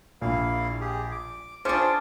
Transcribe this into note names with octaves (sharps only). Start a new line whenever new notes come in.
A#1 A#3 E4 F5
G4 G#4
D6
C#4 D4 F4 G#4 C5 D6